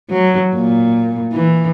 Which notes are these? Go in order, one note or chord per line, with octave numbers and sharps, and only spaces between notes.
F#3
A#2
E3